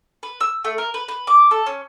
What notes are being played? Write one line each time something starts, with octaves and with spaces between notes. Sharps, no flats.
B4
E6
A3
A#4
B4
B4
D6
A4
C#4